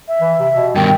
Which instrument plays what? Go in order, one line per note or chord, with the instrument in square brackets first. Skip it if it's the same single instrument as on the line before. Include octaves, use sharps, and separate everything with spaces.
[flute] E5
[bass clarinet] E3
C3
B2
[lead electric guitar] G2 B2 [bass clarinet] D#3 [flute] G5